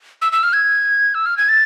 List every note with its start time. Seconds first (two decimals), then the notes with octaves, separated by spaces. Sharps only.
0.22 E6
0.32 E6
0.43 F6
0.53 G#6
1.14 E6
1.26 F6
1.38 G#6
1.49 A6